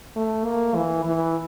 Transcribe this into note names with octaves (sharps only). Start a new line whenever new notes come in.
A3
A#3
E3
E3